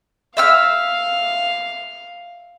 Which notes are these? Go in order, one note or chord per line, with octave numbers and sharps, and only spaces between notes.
E5 F5 E6 F6